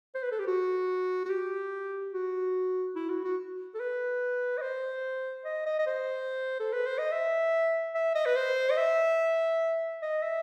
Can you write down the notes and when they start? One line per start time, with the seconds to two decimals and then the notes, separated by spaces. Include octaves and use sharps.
0.15 C5
0.23 B4
0.31 A4
0.39 G4
0.47 F#4
1.25 F#4
1.30 G4
2.13 F#4
2.96 E4
3.09 F#4
3.24 F#4
3.74 A4
3.80 B4
4.58 D#5
4.62 C5
5.45 D#5
5.66 D#5
5.79 D#5
5.86 C5
6.60 A4
6.73 B4
6.86 C5
6.98 D#5
7.12 E5
7.95 E5
8.15 D#5
8.25 B4
8.36 C5
8.70 D#5
8.77 E5
10.02 D#5
10.22 E5